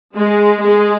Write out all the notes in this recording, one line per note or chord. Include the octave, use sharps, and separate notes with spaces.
G#3
G#3